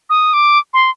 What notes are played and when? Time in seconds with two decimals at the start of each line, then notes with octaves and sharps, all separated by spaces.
0.10 D#6
0.34 D6
0.74 C6